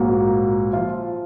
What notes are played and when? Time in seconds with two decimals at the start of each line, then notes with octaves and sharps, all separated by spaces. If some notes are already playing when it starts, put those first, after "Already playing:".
Already playing: A#1 G#2 F#3 A#3 F#4
0.73 F3 F4